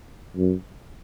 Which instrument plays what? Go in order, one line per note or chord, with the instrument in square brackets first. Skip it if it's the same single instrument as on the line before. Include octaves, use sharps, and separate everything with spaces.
[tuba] F#2